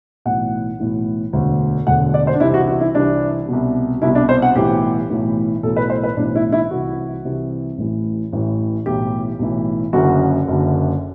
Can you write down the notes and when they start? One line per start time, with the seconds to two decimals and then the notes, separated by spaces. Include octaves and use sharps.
0.25 B1 A2 E3 F#5
0.80 B1 A2 E3
1.33 E1 D2 D3
1.87 E1 D2 D3 F#5
2.14 D5
2.27 C5
2.35 D4
2.40 C2 C3 E3 E4
2.54 F#4
2.68 F#4
2.81 E4
2.95 C2 C3 E3 D4
3.48 C2 B2
4.02 C2 B2 E4
4.15 D4
4.29 C5
4.42 F#5
4.55 B1 A2 E3 G4
5.10 B1 A2 E3
5.63 B1 A2 E3 A4
5.77 B4
5.90 C5
6.04 B4
6.17 B1 A2 E3 D4
6.35 E4
6.52 E4
6.71 C2 C3 E3 F#4
7.25 C2 C3 E3
7.78 A1 A2 E3
8.33 A1 A2 E3
8.86 B1 A2 E3 G4
9.39 B1 A2 E3
9.93 F#1 F#2 D3 F#4
10.47 F#1 F#2 D3